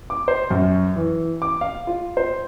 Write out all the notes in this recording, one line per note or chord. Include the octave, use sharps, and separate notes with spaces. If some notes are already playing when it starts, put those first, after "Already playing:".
D6
C5
F#2
E3
D6
F5
F4
C5